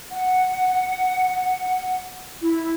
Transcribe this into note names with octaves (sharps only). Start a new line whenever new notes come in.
F#5
E4